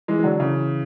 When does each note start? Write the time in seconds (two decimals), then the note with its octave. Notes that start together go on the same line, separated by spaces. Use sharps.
0.08 E3 G#3
0.19 E3
0.23 D3 F#3
0.39 C#3 E3